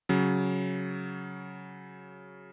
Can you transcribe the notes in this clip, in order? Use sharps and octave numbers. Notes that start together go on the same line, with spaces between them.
C#3 F#3